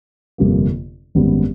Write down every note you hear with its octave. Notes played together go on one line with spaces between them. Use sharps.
G1 F2 C3 F3 A#3
G#1 F#2 D#3 G3 B3